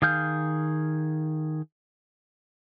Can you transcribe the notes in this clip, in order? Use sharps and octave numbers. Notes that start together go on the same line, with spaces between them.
D#3 G#4 F5 F6 G6